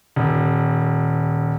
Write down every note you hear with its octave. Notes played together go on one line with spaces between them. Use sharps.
D#1